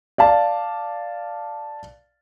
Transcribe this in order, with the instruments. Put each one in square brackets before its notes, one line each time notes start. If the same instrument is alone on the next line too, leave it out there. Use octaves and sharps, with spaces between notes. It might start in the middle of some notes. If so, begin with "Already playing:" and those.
[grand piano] D5 F5 A5